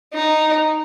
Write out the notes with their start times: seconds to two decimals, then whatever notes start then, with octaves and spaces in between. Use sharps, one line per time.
0.14 D#4